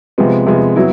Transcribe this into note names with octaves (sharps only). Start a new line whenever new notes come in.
C3 F3 G#3 B3
C3 F3 G#3 B3
F#3 B3 E4